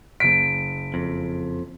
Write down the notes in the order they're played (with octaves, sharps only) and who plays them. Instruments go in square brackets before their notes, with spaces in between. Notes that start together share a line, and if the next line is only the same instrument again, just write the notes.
[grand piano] F#1 B6 [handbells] D7
[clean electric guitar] F2